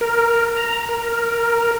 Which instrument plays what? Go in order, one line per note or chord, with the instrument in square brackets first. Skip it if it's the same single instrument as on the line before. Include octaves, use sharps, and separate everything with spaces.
[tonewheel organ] A#4
A#5
A#4